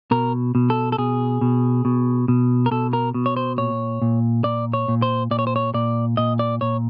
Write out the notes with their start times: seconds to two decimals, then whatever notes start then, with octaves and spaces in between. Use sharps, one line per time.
0.11 B2 A#4
0.55 B2
0.70 A4
0.92 A4
0.98 B2 G#4
1.41 B2
1.85 B2
2.28 B2
2.66 A#4
2.71 B2 A4
2.93 A#4
3.14 B2
3.26 C#5
3.37 C5
3.58 A#2 C#5
4.02 A#2
4.44 A#2 D5
4.73 C#5
4.88 A#2
5.02 C5
5.31 A#2 D5
5.39 C#5
5.47 C5
5.56 C#5
5.74 A#2 D5
6.17 A#2 D#5
6.39 D5
6.61 A#2 C#5